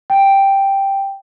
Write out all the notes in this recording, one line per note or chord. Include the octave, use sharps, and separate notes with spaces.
G5